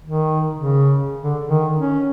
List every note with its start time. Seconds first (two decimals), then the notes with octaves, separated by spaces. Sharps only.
0.04 D#3
0.56 C#3
1.22 D3
1.47 D#3
1.76 C#4